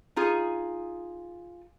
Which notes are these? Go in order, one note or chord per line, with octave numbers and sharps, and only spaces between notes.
D#4 F4 G#4